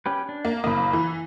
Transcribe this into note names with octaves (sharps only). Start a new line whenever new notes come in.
C#4 G4 B4
D4
A#3
F#1 A#3 B5 D#6
E3